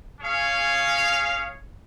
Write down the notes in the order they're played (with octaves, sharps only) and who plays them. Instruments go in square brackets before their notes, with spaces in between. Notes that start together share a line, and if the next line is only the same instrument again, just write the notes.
[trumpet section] C#4 G#4 C#5 F5